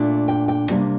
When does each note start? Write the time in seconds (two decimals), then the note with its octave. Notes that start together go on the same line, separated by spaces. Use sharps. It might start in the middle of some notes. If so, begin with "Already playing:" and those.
Already playing: A#2 A3 D4
0.28 G5
0.48 G5
0.70 C3 G3 A#3 D4